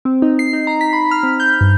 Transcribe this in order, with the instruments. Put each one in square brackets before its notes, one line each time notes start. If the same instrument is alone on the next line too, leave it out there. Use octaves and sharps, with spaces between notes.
[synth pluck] C4
D#4
C7
D#4
A#5
B6
B5
F6
C4
G6
G2